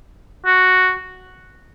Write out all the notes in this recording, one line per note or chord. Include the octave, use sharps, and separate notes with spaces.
F#4